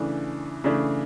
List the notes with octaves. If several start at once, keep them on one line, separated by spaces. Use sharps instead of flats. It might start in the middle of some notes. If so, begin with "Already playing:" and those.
Already playing: C#3 E3 A3 D4
C#3 E3 A3 D4